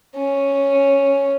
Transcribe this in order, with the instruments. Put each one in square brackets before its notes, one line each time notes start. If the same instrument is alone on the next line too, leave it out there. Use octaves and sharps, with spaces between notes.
[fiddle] C#4